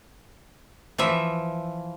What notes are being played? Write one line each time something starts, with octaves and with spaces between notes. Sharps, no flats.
E3 F3 E5